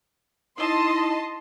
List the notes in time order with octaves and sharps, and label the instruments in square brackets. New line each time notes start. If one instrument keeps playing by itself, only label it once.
[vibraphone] D#4 E4 [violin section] D#5 A5 C6